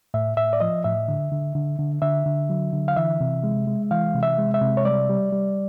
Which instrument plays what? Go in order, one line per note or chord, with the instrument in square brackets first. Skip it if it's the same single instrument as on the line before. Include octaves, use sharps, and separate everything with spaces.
[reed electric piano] A2 E5
A2 E5
D5
F3 D#5
A2 E5
D3
D3
D3
D3
D3 E5
D3
F#3
D3
F5
E3 E5
C3
G#3
G#3
E3 F5
C3
E5
G#3
E5
C3
C#5
G3 D5
G3
G3